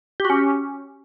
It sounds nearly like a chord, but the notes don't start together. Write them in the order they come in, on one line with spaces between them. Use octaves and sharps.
G4 F#4 C#4